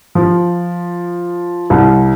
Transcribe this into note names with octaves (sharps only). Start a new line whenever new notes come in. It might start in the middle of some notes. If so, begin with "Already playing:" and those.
F3
C2